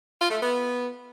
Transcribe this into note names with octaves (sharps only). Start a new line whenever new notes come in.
F4
A3
B3